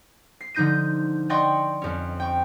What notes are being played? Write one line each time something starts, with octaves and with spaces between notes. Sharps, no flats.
C7
D3 F3 D#4 G6 A#6 D#7
D5 D#5 F#5 G5 C6 C#6
F2 C#4
G5 C#6